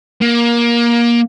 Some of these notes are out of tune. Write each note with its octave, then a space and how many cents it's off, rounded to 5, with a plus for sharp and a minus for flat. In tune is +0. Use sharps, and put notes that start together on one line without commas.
A#3 +20